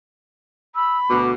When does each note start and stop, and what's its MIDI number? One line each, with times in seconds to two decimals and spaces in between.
0.75 1.19 83
0.75 0.98 88
1.10 1.34 38
1.10 1.34 47
1.10 1.31 86